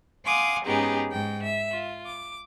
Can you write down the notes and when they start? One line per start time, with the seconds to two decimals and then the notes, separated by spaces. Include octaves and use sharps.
0.25 F5 F#5 G#5 C6 D6 D#6
0.65 G#2 B3 C#4 D#4 G4 G#4
1.10 G#2 G5
1.43 E5
1.72 F4
2.06 D6